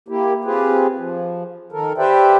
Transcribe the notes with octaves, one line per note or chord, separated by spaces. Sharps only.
A#3 E4 G4
C4 F4 G4 G#4 B4
F3
D#3 A4 A#4
G4 B4 C5 D5 E5 G5